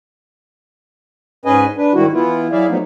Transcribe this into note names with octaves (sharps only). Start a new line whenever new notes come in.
G#2 C#4 G#4 B4 D#5 G#5
D4 B4
G#2 D#3 G3 E4 F#4
E3 B3 E4 F4
F#3 E4 G#4 D5 E5 F5
F3 F#3 A3 B3 D#4